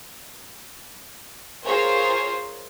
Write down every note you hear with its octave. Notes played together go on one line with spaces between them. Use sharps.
F4 G#4 A#4 C5 C#5